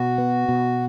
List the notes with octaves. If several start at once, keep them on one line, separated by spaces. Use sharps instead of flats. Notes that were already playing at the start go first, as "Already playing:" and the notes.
Already playing: B2 F#4
B3
B2